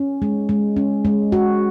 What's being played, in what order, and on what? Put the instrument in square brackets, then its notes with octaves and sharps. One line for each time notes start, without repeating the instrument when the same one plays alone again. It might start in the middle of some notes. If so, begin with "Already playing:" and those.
Already playing: [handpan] C#4
G#3
G#3
C#4
G#3
F#4